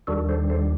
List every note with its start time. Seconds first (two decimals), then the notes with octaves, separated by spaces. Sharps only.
0.07 D#2 D#3 G3 D4 F#4 A4
0.29 A4 C5
0.50 A4 C5